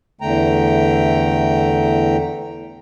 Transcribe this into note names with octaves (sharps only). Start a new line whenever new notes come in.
E2 D3 A3 G5 A#5